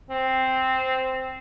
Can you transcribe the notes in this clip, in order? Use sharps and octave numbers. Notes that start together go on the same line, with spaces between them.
C4